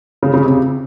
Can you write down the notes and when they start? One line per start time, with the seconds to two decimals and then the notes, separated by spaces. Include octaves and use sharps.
0.23 C#3
0.34 C#3
0.45 C3